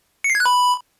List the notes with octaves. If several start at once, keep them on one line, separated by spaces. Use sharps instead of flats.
C#7
C7
G#6
F#6
B5